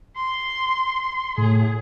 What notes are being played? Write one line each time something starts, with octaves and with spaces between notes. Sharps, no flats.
C6
A2 G#4